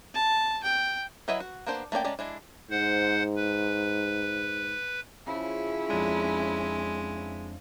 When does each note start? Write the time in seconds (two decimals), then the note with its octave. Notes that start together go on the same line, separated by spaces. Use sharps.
0.14 A5
0.63 G5
1.28 F#3 E4 B4 D#5 E5
1.40 F#4
1.66 A#3 B3 D4 C5
1.92 A3 A#3 C#4 D5 G5
2.04 G#3 A3 C#4 D5 A#5
2.19 G#3 D4 E4
2.70 G#2 C5 F#5
3.36 B4
5.27 C#3 F3 C#4 E4
5.90 F2 G#3 D4